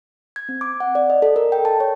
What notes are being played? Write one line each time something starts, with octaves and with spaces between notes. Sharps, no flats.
G#6
C4
D6
F#5
D5
D#5
A4
A#4
G5
A5
C#5